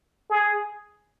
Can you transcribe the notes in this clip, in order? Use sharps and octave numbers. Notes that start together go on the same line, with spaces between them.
G#4